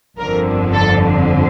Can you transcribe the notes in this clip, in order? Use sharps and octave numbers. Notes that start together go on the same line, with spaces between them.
G1 F2 D3 A#4
A4